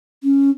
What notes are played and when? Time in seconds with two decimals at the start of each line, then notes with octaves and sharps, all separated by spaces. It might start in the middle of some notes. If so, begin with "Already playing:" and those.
0.23 C#4